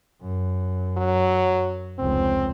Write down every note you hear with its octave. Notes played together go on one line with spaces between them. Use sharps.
F#2
F#3
F1 C#2 C4